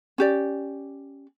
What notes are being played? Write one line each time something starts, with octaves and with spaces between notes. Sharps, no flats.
C#4 G4 D5